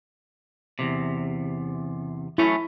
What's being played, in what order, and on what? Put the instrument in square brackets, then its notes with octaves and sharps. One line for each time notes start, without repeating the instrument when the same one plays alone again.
[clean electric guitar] E2 G#2 C3
[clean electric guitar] F#3 A3 C#4 [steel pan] E4